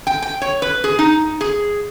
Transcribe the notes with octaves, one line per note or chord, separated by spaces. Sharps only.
G5
G5
C#5
B4
G#4
D#4
G#4